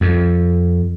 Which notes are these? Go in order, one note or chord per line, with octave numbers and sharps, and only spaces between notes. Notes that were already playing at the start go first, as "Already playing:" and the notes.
F2